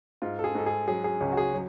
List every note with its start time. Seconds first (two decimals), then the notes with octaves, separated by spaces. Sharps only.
0.22 G#2 F4
0.39 A4
0.44 G#4
0.55 G#2 A4
0.66 G#4
0.88 F#3 G#4
1.04 G#4
1.21 C#2 C#4
1.32 F#4
1.37 G#4
1.54 F#3